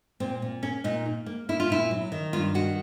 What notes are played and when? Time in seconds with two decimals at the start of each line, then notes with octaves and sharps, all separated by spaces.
0.20 A#2 C4
0.42 A#2
0.62 A#3 C#4
0.84 A#2 D#4
1.05 A#3
1.26 A#3
1.49 A#3 E4
1.60 F4
1.70 A#2 E4
1.91 F#3
2.12 D#3
2.33 G2 F4
2.54 D#3 F#4